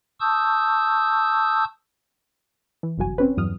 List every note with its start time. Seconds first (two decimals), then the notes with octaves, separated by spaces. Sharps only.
0.21 A5 C#6 D#6 E6 G6
2.83 E3
2.98 G1 C2 F#2 F#4 G#5
3.18 C4 C#4 B4
3.37 E2 G2 F#3 D#6 F6